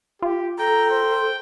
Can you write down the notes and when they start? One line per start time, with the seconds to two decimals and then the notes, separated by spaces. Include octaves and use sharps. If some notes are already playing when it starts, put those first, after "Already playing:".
0.22 F4 G4
0.59 A4 G5 A#5
0.90 C5